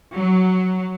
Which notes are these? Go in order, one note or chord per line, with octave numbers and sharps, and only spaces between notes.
F#3